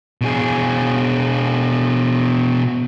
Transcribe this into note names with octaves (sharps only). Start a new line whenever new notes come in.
B2 G#4